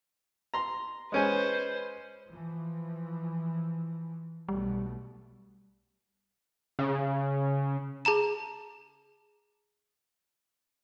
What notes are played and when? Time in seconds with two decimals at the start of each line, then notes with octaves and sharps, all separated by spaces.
0.54 A#5 C6
1.12 G#3 C#4 B4 C5 G#5
2.27 E3 F3
4.49 B1 B2 G3 A3
6.79 C#3
8.05 G#4 A5 A#5 E7